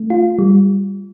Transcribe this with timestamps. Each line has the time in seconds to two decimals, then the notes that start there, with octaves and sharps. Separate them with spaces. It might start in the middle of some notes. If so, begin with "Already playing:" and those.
Already playing: A3
0.10 F4
0.39 G3